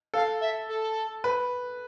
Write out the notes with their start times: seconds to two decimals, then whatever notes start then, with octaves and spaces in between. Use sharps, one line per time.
0.14 A4 F5
0.41 E5
0.68 A4
1.24 B4